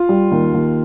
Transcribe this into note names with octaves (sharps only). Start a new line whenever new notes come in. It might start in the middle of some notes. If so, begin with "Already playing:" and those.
Already playing: F4
G3
D#2
D#2